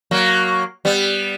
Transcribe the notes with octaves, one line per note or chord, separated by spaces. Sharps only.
F#3 A#3
G3 B3